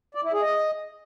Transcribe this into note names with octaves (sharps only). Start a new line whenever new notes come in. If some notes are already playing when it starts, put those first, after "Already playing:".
D5
E4
G#4
D#5